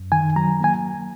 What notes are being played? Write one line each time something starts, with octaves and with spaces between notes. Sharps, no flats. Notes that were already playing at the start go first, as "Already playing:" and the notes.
Already playing: F#2
D#3 G#5
F#3 A#5
A#3 G#5